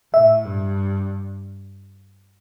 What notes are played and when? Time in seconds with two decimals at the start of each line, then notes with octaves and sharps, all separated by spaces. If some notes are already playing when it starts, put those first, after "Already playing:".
0.13 A2 E5
0.45 G2